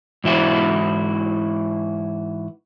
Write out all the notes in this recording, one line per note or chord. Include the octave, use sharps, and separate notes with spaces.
G#2 E3 E4 F#4